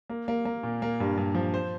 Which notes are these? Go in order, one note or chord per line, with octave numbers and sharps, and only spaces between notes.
A#3
A#3
A#3
A#2
A#3
G2
G2
F3
C5